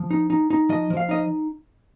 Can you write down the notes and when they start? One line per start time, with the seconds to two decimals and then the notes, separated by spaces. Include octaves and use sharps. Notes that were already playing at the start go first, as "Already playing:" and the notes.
Already playing: F3
0.11 D#4
0.30 D#4
0.50 D#4
0.69 F3 D#5
0.90 F3
0.97 F5
1.09 D#4 D#5